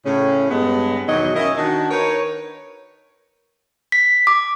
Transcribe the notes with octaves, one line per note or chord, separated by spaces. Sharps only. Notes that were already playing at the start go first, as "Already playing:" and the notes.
A2 C#3 C#4
G2 G#3 B3
E2 B2 D#3 F#3 D#4 D#5
C#4 E4 A#4 D#5
D#3 D4 D#4 F#4
D#4 A#4 B4 C#5
B6
D6